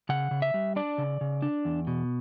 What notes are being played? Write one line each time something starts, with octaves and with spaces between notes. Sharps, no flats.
C#3 F#5
C#3
E5
G3
D4 D5
C#3
C#3
D4
E2
B2